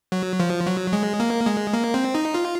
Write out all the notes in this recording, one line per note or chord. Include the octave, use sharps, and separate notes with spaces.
F#3
F3
F#3
G#3
A#3
G#3
A#3
C4
D#4
F4